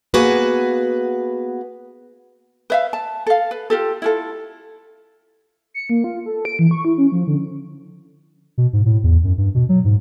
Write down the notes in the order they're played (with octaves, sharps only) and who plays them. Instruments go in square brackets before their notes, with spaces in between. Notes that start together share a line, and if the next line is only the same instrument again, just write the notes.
[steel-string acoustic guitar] A#3 B3 F#4 G#4 B4
[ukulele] B4 E5 F5
A5
A4 F5
B4
F4 G4 A4
E4 F4 A4
[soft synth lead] C#7
A#3
F4
A4
D7
E3
C#6
E4
C#4
F3
D3
[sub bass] B2
G#2
A2
E2
F#2
G2
B2
F#3
G#2